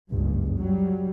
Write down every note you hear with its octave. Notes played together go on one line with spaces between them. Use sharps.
F#1 C#2 G2
F#3 G3